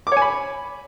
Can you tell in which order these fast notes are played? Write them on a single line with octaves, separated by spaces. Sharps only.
D6 C#5 G#5 B5